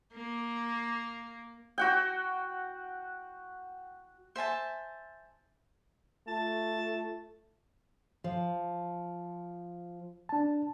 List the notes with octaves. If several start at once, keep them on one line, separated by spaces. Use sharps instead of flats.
A#3
F#4 F#5 G5
C5 E5 G#5 A5
A3 F4 A5
F3
D4 A5